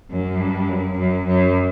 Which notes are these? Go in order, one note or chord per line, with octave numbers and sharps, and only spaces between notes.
F#2
G2
F#2
F#2
F#2